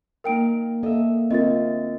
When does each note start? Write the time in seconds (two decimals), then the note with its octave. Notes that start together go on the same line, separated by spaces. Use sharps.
0.24 A#3 D#4 A#4 F5 G5 D7
0.83 A#3 A4 D#5 E5
1.31 D2 C4 F4 A#4 D#5 A6